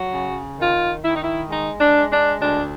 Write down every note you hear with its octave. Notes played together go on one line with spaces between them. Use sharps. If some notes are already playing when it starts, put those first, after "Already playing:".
Already playing: F#3 F#4
C#3
D#3 F4
D#3 E4
D#4
E4
G#3 D#4
D4
G#3
D4
D2 D4